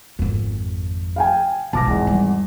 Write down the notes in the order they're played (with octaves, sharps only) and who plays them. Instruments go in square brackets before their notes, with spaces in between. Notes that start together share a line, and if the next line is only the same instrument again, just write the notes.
[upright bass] G#1 F2
[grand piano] F5 G5 G#5
[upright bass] B1 G#2 [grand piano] A5 D6 A#6
[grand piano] G#1 E2 [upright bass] C4
[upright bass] G3